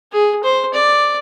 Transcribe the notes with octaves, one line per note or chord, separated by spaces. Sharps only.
G#4
C5
D5